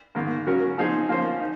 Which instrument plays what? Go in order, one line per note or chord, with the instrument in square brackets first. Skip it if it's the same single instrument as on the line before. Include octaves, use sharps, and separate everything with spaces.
[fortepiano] G#2 D#3 A#3
C#3 F#3 C#4 F#4 A#4
F3 C4 D#4 G#4 C5
F3 A#3 C#4 F4 C5
D#4